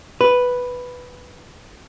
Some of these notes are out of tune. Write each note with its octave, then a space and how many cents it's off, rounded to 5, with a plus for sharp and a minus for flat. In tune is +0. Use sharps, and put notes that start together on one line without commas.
B4 +0